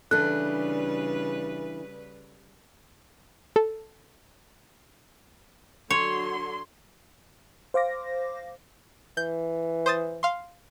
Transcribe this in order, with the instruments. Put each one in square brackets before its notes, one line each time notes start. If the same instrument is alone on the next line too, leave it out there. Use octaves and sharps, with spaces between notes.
[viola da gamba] C#3 G3 B4 [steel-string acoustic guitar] E3 D4 [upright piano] A4 [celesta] F#6
[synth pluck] A4
[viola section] D3 F#3 C6 [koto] C#5
[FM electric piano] C5 F5 D6 A#6
[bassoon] E3 [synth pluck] G6
[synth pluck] C5 D#6 A6
F5 C6